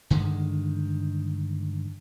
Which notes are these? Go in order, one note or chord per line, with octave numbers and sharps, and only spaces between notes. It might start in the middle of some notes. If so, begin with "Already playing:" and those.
G2 D3 D#3 G#3